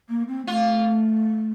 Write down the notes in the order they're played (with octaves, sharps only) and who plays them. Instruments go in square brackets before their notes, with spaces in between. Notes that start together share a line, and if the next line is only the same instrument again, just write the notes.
[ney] A#3
C4
[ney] A3 [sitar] F4